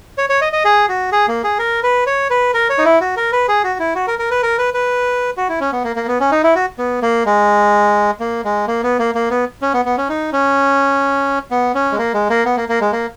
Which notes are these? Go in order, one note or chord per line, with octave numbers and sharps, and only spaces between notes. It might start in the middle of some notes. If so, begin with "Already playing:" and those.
C#5
C#5
D#5
D#5
G#4
F#4
G#4
A#3
G#4
A#4
B4
C#5
B4
A#4
C#5
D#4
E4
F#4
A#4
B4
G#4
F#4
E4
F#4
A#4
A#4
B4
A#4
B4
B4
F#4
E4
C#4
B3
A#3
A#3
B3
C#4
D#4
E4
F#4
B3
A#3
G#3
A#3
G#3
A#3
B3
A#3
A#3
B3
C#4
B3
B3
C#4
D#4
C#4
B3
C#4
G#3
A#3
G#3
A#3
B3
A#3
A#3
G#3
A#3